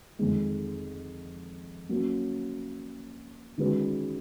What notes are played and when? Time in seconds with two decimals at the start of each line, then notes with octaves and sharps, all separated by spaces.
0.19 F2 D#3 G#3
1.89 F#3 A#3 C#4
3.58 D#3 G#3 C#4 F#4 B4